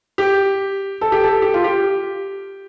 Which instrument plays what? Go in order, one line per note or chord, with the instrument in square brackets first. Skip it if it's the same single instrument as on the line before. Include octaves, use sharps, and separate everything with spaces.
[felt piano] G4
A4
G4
A4
G4
F4
G4